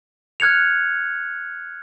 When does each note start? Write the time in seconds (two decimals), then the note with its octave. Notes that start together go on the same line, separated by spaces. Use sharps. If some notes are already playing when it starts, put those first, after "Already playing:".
0.40 F6 F#6 G#6 C#7 F7